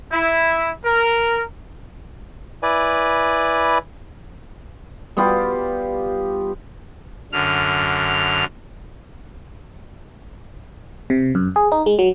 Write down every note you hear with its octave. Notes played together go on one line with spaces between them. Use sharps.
E4
A#4
E4 B4 D5 G#5
G3 B3 F4 G4
F#2 D3 F6
C3
F#2
G#4
D#4
G#3
F#3